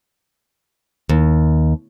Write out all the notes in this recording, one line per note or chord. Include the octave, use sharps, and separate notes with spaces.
D#2